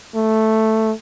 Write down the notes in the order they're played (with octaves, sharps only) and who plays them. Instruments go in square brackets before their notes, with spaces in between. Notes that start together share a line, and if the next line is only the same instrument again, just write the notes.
[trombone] A3